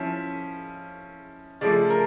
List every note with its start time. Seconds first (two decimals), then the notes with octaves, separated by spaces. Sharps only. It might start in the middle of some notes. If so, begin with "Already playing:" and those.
Already playing: F3 C#4 E4 E5
1.61 C#3 F3 A3 D5
1.90 A#4